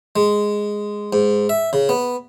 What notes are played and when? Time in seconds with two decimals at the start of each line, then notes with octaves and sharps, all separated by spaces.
0.16 G#3
1.13 G#2
1.49 E5
1.73 C#3
1.89 B3